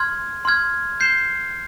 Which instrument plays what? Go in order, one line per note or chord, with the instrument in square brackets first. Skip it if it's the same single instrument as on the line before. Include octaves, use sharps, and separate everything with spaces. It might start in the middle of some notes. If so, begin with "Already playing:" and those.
Already playing: [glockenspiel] C6 F6 G#6
C6 F6 G#6
G6 C7 E7 G7